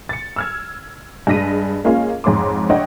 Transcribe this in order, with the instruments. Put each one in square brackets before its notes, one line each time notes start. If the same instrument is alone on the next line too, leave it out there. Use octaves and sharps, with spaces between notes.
[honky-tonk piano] A6 C#7
E6 F6 G#6
G2 G#3 G#4 A#6 B6 D#7
G#3 A#3 C#4 F4 A#4 F5
F2 G#2 C#5 C6 D6
D4 C#5 D#5 E5 F#5 G5